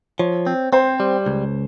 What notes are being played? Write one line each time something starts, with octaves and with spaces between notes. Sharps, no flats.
F3 C#5
C4
C4 C5
G3
C#2